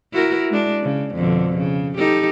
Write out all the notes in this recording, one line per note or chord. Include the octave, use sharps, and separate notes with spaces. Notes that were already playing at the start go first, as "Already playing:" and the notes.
E4 F#4 A#4
G#3 D4
C#3
F2 B2 D3
C#3
D#4 G4 A4